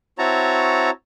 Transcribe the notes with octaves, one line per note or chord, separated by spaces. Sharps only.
C4 E4 F#4 C#5 A5 A#5